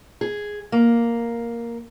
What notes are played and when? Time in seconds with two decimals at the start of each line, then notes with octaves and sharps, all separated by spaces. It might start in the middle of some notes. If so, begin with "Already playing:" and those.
0.21 G#4
0.72 A#3